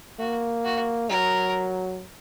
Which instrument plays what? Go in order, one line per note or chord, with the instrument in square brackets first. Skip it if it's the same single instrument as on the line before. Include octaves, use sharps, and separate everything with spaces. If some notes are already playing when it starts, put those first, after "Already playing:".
[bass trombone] A#3 [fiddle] F#4
[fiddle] F#4
[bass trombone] F#3 [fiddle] A#4